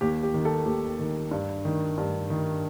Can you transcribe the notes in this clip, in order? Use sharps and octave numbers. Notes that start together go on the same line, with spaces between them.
D#2 G4
G4
D#3
A4
D#2 G4
D#3
G2
D#3
G2
D#3